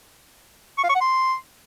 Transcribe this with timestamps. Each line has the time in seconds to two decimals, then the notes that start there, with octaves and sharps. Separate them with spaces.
0.78 C#6
0.84 F5
0.89 C#6
0.95 F#5
1.01 C6